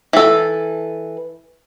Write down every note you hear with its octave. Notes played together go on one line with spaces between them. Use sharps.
E3 A4